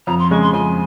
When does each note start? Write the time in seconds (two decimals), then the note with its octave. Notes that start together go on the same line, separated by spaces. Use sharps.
0.07 F2 A#5
0.19 C6
0.30 C#3 G#3 C#6
0.42 C6
0.53 F2 G#5